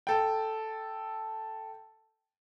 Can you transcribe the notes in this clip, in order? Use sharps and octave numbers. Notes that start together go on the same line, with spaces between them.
A4 G5